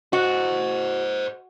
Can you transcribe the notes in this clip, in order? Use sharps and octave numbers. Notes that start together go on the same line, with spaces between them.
F#4 C5 D#5